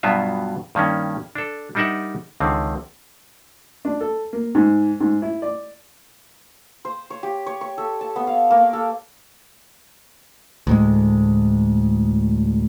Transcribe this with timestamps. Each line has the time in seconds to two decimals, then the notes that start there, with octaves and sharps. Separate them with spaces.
0.03 G2 B2 F#3 B3 F4 E5
0.75 G2 D#3 A#3 C#4
1.35 D4 A4
1.75 G3 D4 D#4 A#4 E5 F#5
2.40 C#2 D3 D#3 C4
3.85 D4
4.00 A4
4.33 A#3
4.55 G#2
5.00 G#2
5.22 E4
5.42 D5
6.85 C5
7.10 C#5
7.23 G4
7.46 C#5
7.61 C#6
7.78 A4
8.01 A5
8.16 B3
8.27 F5
8.51 A#3
8.73 A4
10.67 D2 A2 G#3